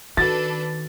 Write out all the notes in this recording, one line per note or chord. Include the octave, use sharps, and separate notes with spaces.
D#3 D4 F#4 A4 B4 A6